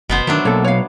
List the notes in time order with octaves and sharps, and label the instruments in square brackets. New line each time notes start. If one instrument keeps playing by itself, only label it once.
[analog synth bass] F#1 [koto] B2 B3 C5
[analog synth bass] D#3 [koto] F#3 A3 D4
[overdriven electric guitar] B1 [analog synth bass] A#3 [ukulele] A4 C#5
[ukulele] C#5 F5